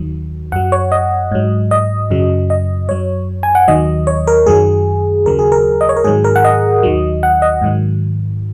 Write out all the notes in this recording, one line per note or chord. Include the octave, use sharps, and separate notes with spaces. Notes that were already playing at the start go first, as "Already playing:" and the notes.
Already playing: D#2 D#3 F#3
F#2 F#3 F#5
C#5
D#5
G#2 F#3
D#5
F#2 C#3 F#3
D#5
F#2 F#3 C#5
G#5
F#5
D#2 D#3 F#3 D#5
C#5
A#4
F#2 D#3 F#3 G#4
D#2 C#3 F#3 A#4
G#4
A#4
D#5
C#5
A#4
G#2 D#3 F#3 G#4
A#4
F#5
D#5
D#2 D#3 F#3
F#5
D#5
G#2 D#3 F#3